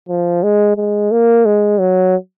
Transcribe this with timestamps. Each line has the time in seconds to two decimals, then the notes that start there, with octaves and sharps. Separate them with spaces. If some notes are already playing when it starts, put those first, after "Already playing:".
0.09 F3
0.43 G#3
0.77 G#3
1.11 A#3
1.45 G#3
1.80 F#3